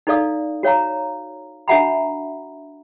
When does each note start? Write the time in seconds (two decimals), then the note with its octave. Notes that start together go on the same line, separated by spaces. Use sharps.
0.07 D#4 E4 A4 D5 F5 D#6
0.63 F#4 C#5 F5 A#5
1.68 D4 F#4 E5 F#5 A#5 B5